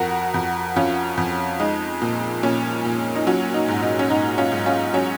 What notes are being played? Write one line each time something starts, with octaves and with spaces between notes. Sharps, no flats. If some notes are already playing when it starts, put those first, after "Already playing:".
Already playing: F2 F#4 A#4
F2
F2 C#4 F4
F2
G#3 D#4
A#2
A#2 C#4
A#2
D#4
F#3 C#4
D#4
G#2
D#4
C#4
G#2 D#4
C#4 F4
G#2
C#4 F4
F#3 C#4